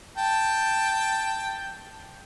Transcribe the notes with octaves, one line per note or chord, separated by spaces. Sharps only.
G5 A5